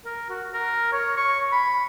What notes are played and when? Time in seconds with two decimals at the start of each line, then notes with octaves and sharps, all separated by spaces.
0.05 A#4
0.29 F#4
0.54 A#4
0.92 C#5
1.17 C#6
1.52 B5